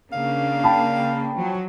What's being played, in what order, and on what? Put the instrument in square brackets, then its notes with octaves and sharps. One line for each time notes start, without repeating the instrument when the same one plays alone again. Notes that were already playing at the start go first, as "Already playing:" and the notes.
[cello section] C#3 A#3 D4 [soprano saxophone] F5
[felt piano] G5 A5 B5
[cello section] F3 F#3